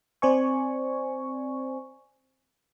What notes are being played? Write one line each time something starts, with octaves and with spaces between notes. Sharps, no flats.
C4 C5 D5 G#5 C#6